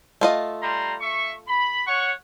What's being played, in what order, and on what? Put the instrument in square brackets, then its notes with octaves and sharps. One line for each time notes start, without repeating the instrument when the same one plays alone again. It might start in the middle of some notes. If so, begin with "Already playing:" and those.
[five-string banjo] A3 F4 D#5
[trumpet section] G3 A#5 C6
E5 C#6
B5
C#5 F#5 C#6